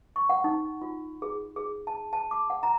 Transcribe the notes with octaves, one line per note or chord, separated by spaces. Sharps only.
C#6
F#5
D#4
F4
G#4
G#4
A5
A5
D6
F#5
A#5